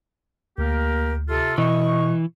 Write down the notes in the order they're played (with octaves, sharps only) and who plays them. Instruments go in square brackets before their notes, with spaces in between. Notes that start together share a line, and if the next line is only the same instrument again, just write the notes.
[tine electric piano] D2 [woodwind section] A#3 G4 A#4
[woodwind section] C3 F4 A4
[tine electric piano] B2 [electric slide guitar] E3 [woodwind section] D#5 C#6